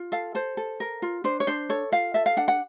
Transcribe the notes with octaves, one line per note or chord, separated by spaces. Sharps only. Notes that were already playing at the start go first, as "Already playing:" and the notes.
Already playing: F4
A4 F5
A4 C5
A4
A#4
F4
D4 C5
C#5
D4 C5
A4 C#5
F4 F5
A4 E5
F5
D4 F#5
F#5